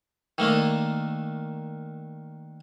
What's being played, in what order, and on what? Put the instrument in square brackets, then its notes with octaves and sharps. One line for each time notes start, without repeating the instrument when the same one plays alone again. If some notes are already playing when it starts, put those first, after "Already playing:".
[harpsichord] D#3 A3 A#3 D4